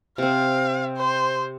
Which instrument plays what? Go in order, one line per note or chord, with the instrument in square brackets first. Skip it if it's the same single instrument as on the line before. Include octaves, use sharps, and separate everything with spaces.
[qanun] C3 C4 [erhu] F5
[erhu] C5